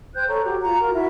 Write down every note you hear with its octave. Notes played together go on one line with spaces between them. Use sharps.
C5 G5 F#6 G6
A4 C#5 A#5 C#6
F#4 G4
F4 A#5
F#4 A#4
E4 F#4 E5